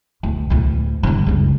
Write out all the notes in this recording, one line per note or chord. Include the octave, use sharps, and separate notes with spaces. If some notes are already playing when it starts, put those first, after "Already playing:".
D2
D2 A2
G2 D3
F#1 C#2